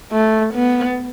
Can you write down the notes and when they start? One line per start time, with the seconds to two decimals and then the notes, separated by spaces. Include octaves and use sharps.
0.12 A3
0.54 B3